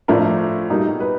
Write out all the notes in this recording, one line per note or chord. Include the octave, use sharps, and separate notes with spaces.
A2 F3 A3 D4 A#4
B2 G3 A#3 D#4
B4